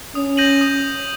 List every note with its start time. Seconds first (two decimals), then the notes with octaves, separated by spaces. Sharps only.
0.15 C#4 D#6
0.37 G6 A#6 D#7 F#7
0.61 D#6